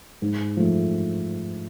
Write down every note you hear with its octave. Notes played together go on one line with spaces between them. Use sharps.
G#2
F3 A3